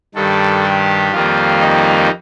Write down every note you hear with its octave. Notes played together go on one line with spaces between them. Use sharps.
G2 D#3 G3 A4
G4
F2 D#3 G3 A#3 F4
D#4